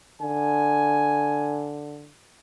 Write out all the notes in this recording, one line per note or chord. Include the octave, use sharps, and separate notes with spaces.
D3 G#5